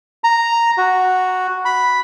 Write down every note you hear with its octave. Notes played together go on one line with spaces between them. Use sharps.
A#5
F#4
B5